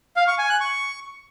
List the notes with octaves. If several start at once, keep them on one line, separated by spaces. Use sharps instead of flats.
F5
C#6
G#5
F#6
C#6